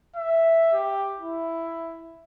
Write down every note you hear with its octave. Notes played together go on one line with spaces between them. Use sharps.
E5
G4
E4